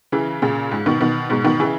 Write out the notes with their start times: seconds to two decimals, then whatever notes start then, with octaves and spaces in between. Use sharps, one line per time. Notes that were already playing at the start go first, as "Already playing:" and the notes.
0.12 C#3 E3
0.42 A#2 C#3
0.71 G#2
0.86 B2 D#3
1.01 B2 D#3
1.30 G#2 B2
1.45 B2 D#3
1.60 C#3 E3